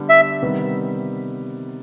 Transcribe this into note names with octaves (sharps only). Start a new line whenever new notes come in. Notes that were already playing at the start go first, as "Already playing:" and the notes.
Already playing: D3 G3 B3
E5
C3 D#3 G3 B3 D#4